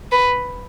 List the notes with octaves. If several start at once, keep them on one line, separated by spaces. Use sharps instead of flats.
B4